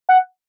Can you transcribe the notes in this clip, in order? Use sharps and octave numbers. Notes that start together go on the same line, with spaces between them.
F#5